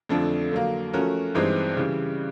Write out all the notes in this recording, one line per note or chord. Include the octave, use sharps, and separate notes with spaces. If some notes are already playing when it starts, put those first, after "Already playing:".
F2 D3 F3 A3 D4
D3 F#3 A#3
F3 A3 C#4 F#4 A#4
G2 E3 G#3 C4 D#4
C#3 E3 G3